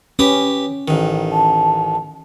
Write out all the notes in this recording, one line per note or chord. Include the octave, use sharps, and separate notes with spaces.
C#4 G4 B4 D#6
A1 D#3
A5